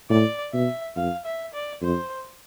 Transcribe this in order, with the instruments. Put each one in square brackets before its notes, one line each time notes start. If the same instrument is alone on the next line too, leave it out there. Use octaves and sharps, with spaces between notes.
[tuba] A2 [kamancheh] D5
[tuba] B2 [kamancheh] E5
[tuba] F2 [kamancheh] F5
[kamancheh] E5
D5
[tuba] F2 [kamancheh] C5